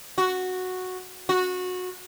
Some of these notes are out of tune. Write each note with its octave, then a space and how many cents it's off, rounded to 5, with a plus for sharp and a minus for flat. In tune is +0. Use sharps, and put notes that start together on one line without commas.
F#4 -5
F#4 -20